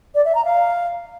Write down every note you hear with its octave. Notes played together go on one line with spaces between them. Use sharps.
D5
E5
A#5
F5